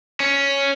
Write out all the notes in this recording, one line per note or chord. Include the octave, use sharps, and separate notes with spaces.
C#4